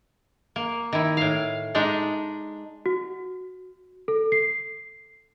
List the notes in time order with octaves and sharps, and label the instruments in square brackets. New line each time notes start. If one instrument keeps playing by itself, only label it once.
[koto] A#3
D#3 E4
A2 F5
G#3 D4 D#4
[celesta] F#4
A4
C7